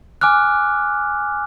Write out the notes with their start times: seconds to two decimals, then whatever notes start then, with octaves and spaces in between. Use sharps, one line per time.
0.21 G#5 D6 F6 F#6